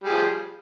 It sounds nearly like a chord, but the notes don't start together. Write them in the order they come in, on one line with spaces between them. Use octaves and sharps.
G3 G#4 F3